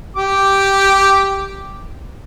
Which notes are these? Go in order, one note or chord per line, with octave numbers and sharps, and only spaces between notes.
G4 D6